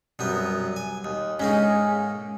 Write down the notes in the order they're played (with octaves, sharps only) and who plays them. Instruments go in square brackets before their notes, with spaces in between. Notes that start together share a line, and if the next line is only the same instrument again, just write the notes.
[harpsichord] C2 F#2 B3
G#5
D#2
[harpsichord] G#2 A#3 D#4 [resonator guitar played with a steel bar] C#4 G#4